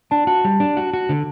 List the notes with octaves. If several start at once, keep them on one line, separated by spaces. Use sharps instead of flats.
D4 A5
F#4 A5
G3
D4
F#4
F#4
D3